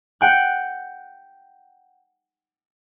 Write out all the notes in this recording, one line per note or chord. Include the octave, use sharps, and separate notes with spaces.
F#5 G5 F#6